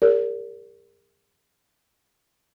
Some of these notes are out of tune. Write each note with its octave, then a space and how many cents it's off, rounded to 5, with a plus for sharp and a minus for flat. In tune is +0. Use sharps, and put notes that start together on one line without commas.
G4 +45 A#4 -15 D5 -40